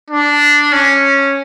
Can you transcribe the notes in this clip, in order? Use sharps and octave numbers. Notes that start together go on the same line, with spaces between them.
D4
C#4